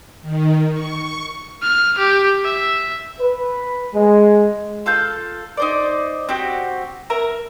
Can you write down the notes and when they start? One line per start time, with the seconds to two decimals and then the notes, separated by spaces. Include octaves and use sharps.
0.22 D#3
0.72 C#6
1.62 F6
1.98 G4
2.44 E5
3.20 B4
3.94 G#3
4.86 F4 A4 F5 G6
5.57 D#4 C5 D5
6.29 C4 F#4 G4
7.10 A#4 E5 A#5